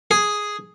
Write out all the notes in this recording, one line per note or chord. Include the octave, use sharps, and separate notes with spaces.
G#4